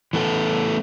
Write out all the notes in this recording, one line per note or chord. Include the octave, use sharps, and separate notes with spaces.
E3 A3 B3 A4